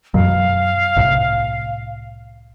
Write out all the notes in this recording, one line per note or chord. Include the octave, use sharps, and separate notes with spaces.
F#2 B2 F#3 F5
C2 A2 C3